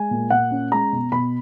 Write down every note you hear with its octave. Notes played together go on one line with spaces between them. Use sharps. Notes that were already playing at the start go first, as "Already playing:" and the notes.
Already playing: G#3 G#5
A#2
A#2 F#5
C#4
G#3 A#5
B2
B2 B5